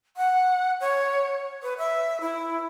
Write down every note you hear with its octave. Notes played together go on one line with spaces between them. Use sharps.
F#5
C#5
B4
E5
E4